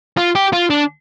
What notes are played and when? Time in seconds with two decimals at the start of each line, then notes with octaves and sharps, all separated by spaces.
0.17 F4
0.35 G4
0.53 F4
0.70 D4